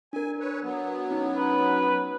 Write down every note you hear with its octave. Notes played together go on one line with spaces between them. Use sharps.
D4 A#4 G#5
B4 C#5
F#3 B3
C#4 D#4
B4